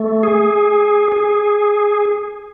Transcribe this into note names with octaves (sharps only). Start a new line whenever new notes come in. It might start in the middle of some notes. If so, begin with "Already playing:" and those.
Already playing: A3
G#4
G#4